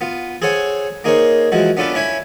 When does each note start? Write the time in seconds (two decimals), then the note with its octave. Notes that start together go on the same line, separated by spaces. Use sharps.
0.01 B3 F4
0.42 G#4 A4 C5 C#5 F#5 G#5
1.04 A#3 D#4 G#4 A#4 C5 C#5
1.52 E3 F3 G#3 F#4
1.77 B3 C#4 D4 F4 A4 B4
1.94 C#4 E4 C#5 G#5 B5